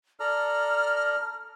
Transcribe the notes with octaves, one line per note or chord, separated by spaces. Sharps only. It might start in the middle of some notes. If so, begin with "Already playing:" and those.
A4 D5 A#5 F6